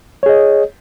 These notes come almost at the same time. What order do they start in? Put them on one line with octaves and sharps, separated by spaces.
C#5 G#4 D#5